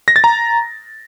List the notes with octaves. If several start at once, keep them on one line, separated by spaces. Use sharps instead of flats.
A#6
A6
A#5